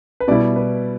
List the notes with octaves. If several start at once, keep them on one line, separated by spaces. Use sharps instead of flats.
B4
B2 G3 E4 D5
B4